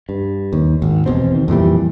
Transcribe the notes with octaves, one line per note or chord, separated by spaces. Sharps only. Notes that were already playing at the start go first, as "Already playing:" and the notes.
G2
D#2
G#1
E2 B2 C4
D#3
F2 A#2 E3 G3